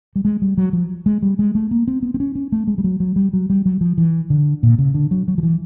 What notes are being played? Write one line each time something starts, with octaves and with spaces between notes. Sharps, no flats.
G3
G#3
G3
F#3
F3
G#3
G3
G#3
A3
A#3
C4
B3
C4
C#4
C#4
A3
G#3
G3
F#3
F#3
G3
F#3
G3
F#3
F3
E3
D3
A#2
C#3
D3
F#3
F#3
F3
E3